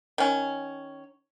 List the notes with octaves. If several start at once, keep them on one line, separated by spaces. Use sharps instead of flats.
D#3 C#4